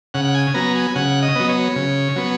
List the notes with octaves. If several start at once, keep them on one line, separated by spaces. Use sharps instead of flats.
C#3 F#5
F#5
G#5
F#3 B3 A#5
G#5
C#3 F#5
D#5
F#3 B3
C#5
C#3
F#3 B3